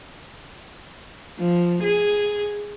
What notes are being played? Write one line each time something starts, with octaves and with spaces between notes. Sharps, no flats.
F3
G#4